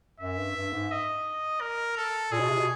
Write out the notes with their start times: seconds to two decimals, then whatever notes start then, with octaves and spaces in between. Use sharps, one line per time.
0.20 F#2 E5
0.38 G2
0.56 G2
0.73 G#2
0.92 D#5
1.61 A#4
1.97 A4
2.32 A#2 G#4
2.40 B2
2.50 C3
2.59 B2